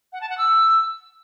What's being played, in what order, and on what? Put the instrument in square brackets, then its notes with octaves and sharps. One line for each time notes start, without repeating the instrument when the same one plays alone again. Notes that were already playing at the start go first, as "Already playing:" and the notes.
[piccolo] F#5
A5
F#5
E6